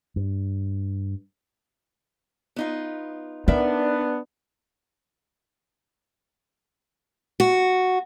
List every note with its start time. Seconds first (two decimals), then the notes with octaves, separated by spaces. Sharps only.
0.16 G2
2.56 B3 D#4 F4
3.48 B3 D4 D#4 A#4 D5 E5
7.40 F#4